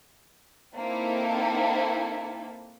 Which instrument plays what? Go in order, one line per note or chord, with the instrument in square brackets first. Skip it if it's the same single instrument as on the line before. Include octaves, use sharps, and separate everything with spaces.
[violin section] A#3 C4 D#4 E4 A4